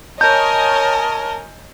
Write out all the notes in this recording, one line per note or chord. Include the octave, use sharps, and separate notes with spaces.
A#4 C#5 D#5 G#5 A5 G6